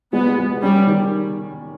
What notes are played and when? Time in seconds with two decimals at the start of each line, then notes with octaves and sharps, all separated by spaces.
0.13 G#3 B3
0.38 G#3
0.62 G3 C#4
0.87 D#3